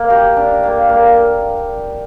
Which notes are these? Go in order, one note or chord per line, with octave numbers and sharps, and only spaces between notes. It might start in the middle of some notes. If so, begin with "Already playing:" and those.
Already playing: A#3
G4
D4
A#3
A#3